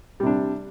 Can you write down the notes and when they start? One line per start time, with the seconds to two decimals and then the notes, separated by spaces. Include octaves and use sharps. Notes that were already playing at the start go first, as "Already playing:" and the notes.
0.20 G3
0.23 C3
0.27 D4